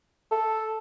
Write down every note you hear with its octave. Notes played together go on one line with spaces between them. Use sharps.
A4